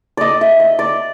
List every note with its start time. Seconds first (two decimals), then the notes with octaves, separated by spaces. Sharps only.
0.17 D5 D#5
0.41 E5
0.60 D#5
0.79 D5